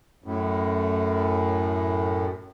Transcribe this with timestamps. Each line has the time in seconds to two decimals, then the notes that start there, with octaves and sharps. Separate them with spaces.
0.24 F#2 A2